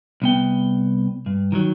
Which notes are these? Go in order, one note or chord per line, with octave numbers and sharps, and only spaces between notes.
C2 B3 G5
G2
D#3 F3 F#3